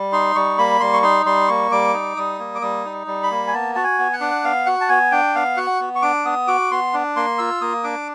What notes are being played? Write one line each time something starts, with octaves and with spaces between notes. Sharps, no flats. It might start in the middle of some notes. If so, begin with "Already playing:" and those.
Already playing: G3
D#4 C6
G3 C#6
A#3 B5
G3 C6
C#6
D#4 C6
G3 C6
A#3 C#6
G3 D6
D#4
G3 D#6
A#3
D6
G3 D#6
D#4
G3
B5
A#3
G#5
B3 A5
F#4 A5
G#5
B3
F#5
D4
B3 F5
F#4 F#5
A5
B3 G#5
D4 G5
B3 F5
F#4 F#5
B3
C#6
D4 D6
B3 D#6
F#4 D6
B3 C6
D4
A#3 C6
F4 E6
A#3 D#6
D4 D6